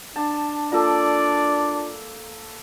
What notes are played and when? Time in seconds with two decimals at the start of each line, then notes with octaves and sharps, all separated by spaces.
0.16 D4 A5
0.72 A#3 F4 A4 D5 A5